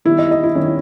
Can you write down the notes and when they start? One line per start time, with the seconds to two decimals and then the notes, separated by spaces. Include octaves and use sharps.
0.05 E2 D#3 G3 E4
0.18 D#5
0.31 D#5
0.44 E4
0.55 D#3 G3 C#4